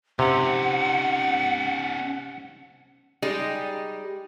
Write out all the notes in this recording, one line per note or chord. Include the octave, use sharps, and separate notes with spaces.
C3 C#4 D#4 F#5
G3 G#3 D#4 G4 G#4